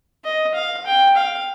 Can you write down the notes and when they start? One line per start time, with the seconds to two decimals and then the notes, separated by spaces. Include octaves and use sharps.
0.24 D#5
0.54 F5
0.86 G5
1.17 F5